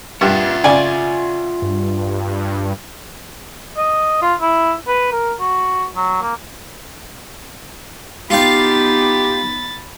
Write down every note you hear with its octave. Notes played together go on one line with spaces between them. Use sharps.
G2 F4 E5 F#5
C#3 D5 G#5
G2
D#5
F4
E4
B4
A#4
F#4
F#3
A#3
B3 D#4 F4 G4 F5 B5 A6